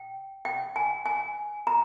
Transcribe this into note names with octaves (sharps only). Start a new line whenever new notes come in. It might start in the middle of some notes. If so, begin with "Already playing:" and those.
Already playing: G5
G5
G#5
G#5
A#5